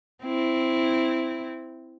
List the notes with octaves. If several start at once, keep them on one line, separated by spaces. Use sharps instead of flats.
C4 E4